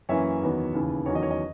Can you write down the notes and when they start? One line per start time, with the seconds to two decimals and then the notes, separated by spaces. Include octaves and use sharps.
0.09 F#2 E3 A#3 C#4 C#5 E5
0.41 E2 D#3 F#3 B3
0.73 D#2 C#3 E3
1.06 E2 D#3 F#3 C#4 C#5
1.15 D#5
1.23 C#5
1.31 D#5